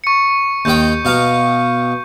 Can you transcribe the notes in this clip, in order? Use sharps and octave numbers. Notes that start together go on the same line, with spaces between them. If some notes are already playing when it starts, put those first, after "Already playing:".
C#6 C#7
D#2 D#3 G5 G6
B2 F5 A#5